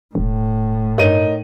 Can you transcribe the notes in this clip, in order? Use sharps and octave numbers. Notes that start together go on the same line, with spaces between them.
E1 A2
G2 D#4 A#4 C#5 D#5 D#7